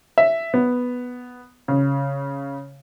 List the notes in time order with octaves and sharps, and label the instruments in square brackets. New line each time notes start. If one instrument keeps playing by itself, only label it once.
[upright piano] E5
B3
C#3